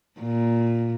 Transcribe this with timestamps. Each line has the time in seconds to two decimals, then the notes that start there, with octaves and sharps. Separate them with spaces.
0.20 A#2